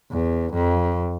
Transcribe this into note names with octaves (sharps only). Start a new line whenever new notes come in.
E2
F2